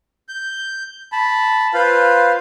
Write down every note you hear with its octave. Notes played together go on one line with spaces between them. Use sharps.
G6
A5 B5
F4 B4 C5 F5